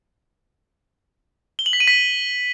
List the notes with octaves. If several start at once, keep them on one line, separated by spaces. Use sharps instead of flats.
G7
F#7
B6
D#7
B6